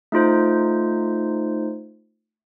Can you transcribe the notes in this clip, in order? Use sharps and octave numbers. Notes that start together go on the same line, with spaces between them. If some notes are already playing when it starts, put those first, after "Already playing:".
A3 D#4 F4 C5